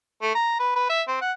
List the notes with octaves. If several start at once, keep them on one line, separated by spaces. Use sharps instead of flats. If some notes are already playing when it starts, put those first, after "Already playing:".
A3
A#5
B4
B4
E5
C4
F#5